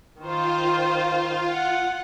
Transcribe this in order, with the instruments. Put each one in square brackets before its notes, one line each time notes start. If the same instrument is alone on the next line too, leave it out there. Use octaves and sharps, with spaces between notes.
[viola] D#3 C5 [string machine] F4
[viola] F#5